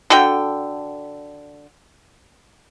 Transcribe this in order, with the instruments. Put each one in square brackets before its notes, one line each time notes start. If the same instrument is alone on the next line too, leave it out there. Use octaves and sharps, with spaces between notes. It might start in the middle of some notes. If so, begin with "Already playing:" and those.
[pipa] D3 F#4 A4 G5